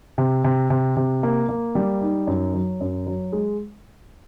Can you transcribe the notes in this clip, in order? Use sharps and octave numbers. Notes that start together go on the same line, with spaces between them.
C3
C3
C3
C3
A#3
A#3
G3
D#4
F#2
F#3
F#2
F#3
G#3